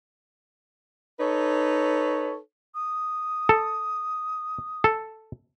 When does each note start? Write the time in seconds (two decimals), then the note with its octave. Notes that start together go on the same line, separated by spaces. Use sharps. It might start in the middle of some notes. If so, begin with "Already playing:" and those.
1.20 D#4 A4 B4 C#5
2.75 D#6
3.49 A4
4.84 A4